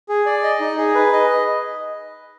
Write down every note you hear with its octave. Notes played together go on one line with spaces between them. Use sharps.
G#4
D5
D#5
D#4
G#4
B4
D#5